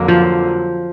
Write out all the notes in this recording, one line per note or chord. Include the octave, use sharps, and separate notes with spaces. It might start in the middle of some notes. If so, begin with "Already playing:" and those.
Already playing: F2 D3 F#3 A#3
F3